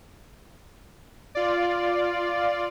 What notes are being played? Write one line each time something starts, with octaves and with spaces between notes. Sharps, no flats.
F4 D5